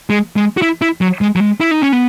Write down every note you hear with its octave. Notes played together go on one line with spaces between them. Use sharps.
G#3
G#3
F#4
E4
E4
F#3
G#3
F#3
G#3
E4
D#4
C#4
B3